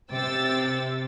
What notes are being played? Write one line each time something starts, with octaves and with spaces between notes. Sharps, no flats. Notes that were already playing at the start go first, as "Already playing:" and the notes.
C3 G5 E6 A6